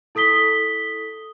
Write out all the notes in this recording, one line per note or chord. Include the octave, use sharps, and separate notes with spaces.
E4 A4 D#6 B6 G7